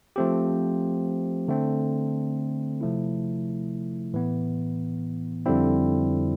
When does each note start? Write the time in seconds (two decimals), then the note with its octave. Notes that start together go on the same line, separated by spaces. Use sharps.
0.16 F3 A3 C4 G4
1.48 D3 A3 C4
2.81 C3 F3 A3 E4
4.14 A2 E3 B3
5.46 F2 D3 G3 C4 E4